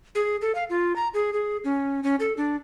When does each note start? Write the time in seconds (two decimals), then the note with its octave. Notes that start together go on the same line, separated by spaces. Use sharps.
0.15 G#4
0.41 A4
0.55 F5
0.70 F4
0.96 A#5
1.14 G#4
1.33 G#4
1.64 C#4
2.03 C#4
2.20 A4
2.37 D4